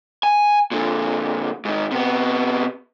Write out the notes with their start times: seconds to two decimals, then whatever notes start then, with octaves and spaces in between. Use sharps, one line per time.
0.23 G#5
0.72 A#2 D3
1.65 G#2 D#3
1.91 C3 B3